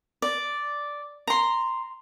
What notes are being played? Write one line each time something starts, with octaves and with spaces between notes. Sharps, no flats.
D5
A#5 C6